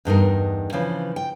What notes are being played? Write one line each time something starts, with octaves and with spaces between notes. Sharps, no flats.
E2 G2 D#4 A#4
C#3 E3 F3
G5